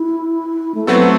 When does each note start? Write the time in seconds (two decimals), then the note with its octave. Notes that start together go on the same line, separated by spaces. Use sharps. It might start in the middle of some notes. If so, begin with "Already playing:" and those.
Already playing: E4
0.75 A3
0.87 F#3 A3 B3 C4 F#4 A4